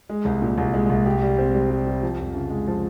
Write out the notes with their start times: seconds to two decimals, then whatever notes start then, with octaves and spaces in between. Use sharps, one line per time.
0.09 G#3
0.25 C2
0.42 A#2
0.58 C2
0.74 G#3
0.90 C2
1.05 G4
1.22 G3
1.38 C4
1.54 G3
1.70 G4
1.87 G3
2.03 F3
2.19 F2
2.34 C#3
2.50 G#3
2.67 F3